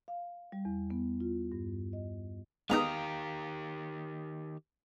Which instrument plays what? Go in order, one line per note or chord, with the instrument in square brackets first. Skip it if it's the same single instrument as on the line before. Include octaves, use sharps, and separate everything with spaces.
[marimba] F5
G3
E2
B3
F4
G2
D#5
[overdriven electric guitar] D#3 G4 [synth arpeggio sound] G#3 B3 D#4 [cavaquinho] F5 A#5 D#6